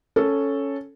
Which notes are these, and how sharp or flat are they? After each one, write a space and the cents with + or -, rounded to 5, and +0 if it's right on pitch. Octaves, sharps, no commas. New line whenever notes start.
C#4 +0 A4 +0